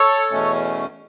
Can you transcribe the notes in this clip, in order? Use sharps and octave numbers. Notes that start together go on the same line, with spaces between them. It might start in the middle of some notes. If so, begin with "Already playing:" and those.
Already playing: A4 C#5
E2 B2 A3 C#4